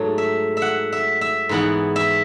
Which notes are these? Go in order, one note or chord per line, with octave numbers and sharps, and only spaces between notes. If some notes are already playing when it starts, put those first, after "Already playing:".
Already playing: G#2 F#3 A3
E5
E5
F#5
E5
E5
G#2 E3 B3 F#5
E5